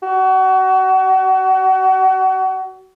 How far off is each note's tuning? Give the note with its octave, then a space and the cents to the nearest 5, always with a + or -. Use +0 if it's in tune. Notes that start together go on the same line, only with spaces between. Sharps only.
F#4 +30